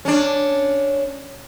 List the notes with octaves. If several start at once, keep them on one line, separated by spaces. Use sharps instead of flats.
C#4 D4